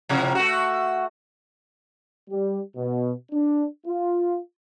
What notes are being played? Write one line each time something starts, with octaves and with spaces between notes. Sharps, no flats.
A2 C3 F3
A3 F#4
G3
B2
D4
F4